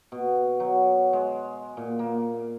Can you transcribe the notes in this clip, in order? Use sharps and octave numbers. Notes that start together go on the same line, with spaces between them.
B2
F#3
G#3
A#2
A#3